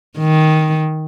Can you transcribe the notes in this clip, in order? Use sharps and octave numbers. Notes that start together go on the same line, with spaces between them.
D#3